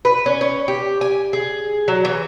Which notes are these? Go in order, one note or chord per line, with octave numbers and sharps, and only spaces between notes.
B4
C#4
C#4
G4
G#5
G#4
F#3
E3